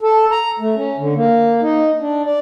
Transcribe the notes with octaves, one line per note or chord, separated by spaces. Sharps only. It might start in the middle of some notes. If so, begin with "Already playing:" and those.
A4
A#5
A3
C#4
D3
A#3
D#4
D4
D5